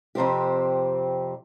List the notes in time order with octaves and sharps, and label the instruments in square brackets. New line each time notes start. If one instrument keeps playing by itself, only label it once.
[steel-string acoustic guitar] F2 C3 C4 G4